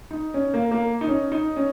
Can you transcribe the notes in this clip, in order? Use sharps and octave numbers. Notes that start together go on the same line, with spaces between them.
D#4
C#4
A#3
A#3
D#4
C#4
D#4
C#4